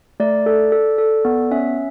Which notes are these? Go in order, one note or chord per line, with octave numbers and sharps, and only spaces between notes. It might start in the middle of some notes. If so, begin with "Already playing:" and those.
A3 D5
A4
A4
A4
B3
C#4 E5